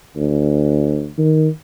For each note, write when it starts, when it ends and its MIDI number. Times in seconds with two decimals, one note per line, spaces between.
0.16 1.09 38
1.18 1.48 51